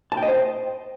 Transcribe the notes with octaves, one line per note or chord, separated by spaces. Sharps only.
A5
G5
D#5
C5